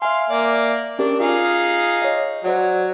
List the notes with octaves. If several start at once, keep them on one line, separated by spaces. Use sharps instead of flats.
E5 F5 G#5 C6
A#3 D5
C#4 D4 G4 A#4
D#4 F4 G#4 F5 D6
C#5 D#5
F#3 C5 D5 F#5